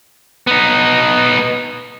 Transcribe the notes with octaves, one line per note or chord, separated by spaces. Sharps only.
B3 D#4